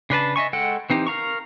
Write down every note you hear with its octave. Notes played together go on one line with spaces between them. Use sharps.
C#3 D4 B4 A5
D#5 E5 G#5 C#6
G#3 A4 F#5 G5
E3 C4 D#4 G4
A#4 F5 A#5 C#6